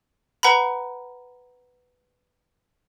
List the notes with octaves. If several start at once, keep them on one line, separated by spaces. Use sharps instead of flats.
B4 F#5 A#5 B5